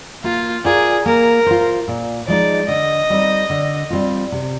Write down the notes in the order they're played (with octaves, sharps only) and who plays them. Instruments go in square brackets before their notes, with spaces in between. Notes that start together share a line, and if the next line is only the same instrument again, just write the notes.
[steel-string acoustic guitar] A#3 [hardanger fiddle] F4
[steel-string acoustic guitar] F4 A#4 D5 [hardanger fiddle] G#4
[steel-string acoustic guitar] A#3 [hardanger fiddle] A#4
[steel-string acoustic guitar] F4 C5
A#2
[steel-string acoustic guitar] F3 G#3 D#4 [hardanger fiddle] D5
[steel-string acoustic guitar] D3 [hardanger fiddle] D#5
[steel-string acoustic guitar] G3 C4 D#4
D3
G3 C4 F4
C3